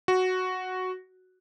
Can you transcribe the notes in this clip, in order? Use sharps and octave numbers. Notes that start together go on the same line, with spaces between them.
F#4